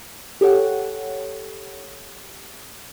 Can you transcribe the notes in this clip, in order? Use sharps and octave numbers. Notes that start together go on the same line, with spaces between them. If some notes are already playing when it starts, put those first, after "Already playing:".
G4 A4 C#5 F#5